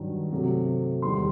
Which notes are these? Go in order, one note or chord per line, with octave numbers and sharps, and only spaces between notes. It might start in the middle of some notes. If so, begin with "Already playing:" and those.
Already playing: G2 D#3 F#3
C3 F#3 A3
E2 D#3 G3 C6